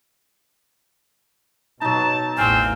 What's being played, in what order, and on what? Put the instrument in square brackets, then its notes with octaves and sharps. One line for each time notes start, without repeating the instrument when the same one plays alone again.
[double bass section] B2 [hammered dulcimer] F#3 D#4 [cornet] A5
[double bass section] A1 E2 [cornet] C4 [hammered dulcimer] F5 [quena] G#5